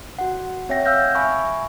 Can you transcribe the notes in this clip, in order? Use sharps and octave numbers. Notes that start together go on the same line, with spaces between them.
F#4 F#5
C4 C#5 E5 F#5 G5 A#6
F5 E6 F6 G6 A#6
E5 G#5 B5 C#6